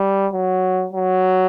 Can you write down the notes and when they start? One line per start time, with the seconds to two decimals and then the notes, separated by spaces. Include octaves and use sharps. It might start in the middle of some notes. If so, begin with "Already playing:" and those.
Already playing: G3
0.33 F#3
0.93 F#3